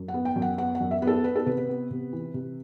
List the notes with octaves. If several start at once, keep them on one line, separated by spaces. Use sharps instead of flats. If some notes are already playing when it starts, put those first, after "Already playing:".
Already playing: F#2
F#5
B3
G5
F#2
F#5
B3 F#5
F#5
F#2
E5
B3
A4
B3 B4
A4
C3 B4
B4
B3
C3
E3
C3